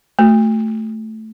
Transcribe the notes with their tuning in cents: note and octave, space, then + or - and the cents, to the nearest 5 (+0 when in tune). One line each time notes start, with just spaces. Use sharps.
A3 +0 F#4 +0